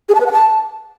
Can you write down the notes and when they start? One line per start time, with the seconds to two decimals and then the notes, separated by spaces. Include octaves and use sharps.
0.09 G#4
0.15 A5
0.20 B4
0.26 F#5
0.32 A5